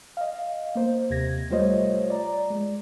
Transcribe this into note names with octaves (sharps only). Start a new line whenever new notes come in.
D#5 F5
A#3 C5
D#2 C3 G#6 A#6
G3 A3 F4 C5 C#5 D#5
D5 A#5
G#3